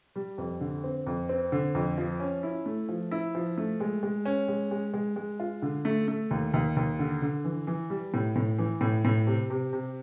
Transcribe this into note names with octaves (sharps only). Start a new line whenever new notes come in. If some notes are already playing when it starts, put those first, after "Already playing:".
G3
F2
D3
C4
F2
C4
D3
F2
F3
C#4
E4
A3
F3
E4
F3
A3
G#3
G#3
C#4
G#3
G#3
G#3
G#3
F4
D3
A3
A3
D#2
D#2
D#2
D3
D3
E3
E3
G3
A2
A2
E3
A2
A2
C3
C3
C3